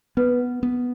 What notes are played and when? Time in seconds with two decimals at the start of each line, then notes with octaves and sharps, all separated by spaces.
0.17 B3 B4
0.63 B3